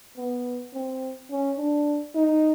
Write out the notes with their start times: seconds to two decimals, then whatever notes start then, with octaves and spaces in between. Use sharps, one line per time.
0.17 B3
0.74 C4
1.31 C#4
1.58 D4
2.15 D#4